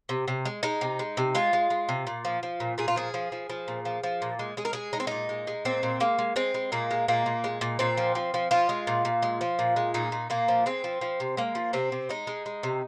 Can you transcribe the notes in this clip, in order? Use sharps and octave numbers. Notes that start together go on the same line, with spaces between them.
C3
C3
G#3
G#3 D#4
C3
G#3
C3
G#3 F4
G#3
G#3
C3
A#2
F3
F3
A#2
A#2 G#4
F4
F3 G#4
F3
F3
F3
A#2
F3
F3
A#2
G#3
G#3 G#4
A#4
G#3 G#4
G#3 D#4
C4
A#2 D#4
G#3
G#3
A#2 C4
A#2
G#3 A#3
G#3
G#3 C4
G#3
A#2 A#3
G#3
A#2 A#3
A#2
G#3
A#2
A#2 C4
F3
F3
F3
F3 F4
G#3
A#2
A#2
G#3
F3
A#2
G#3
A#2 D#4
A#2
A#2 A#3
F3
G#3 C4
F3
F3
C3
G#3 A#3
F3
C3 C4
C3
G#3 D#4
G#3
G#3
C3